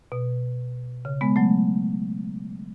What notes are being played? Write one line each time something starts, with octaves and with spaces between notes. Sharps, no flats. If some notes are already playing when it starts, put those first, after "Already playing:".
B2
C#3
G#3 B3
F#3 A3